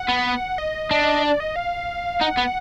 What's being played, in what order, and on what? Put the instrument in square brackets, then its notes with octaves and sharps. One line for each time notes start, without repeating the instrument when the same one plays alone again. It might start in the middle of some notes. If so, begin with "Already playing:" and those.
Already playing: [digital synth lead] F#5
[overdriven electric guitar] B3
[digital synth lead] D#5
[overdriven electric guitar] D4
[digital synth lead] D5
D#5
F5
[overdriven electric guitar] D#4 [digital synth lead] F#5
[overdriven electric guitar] B3